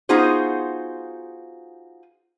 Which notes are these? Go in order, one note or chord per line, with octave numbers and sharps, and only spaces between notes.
B3 D#4 F4 F#4 G#4 C5